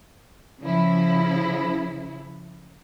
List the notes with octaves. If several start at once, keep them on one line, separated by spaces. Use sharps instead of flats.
C#3 F3 E4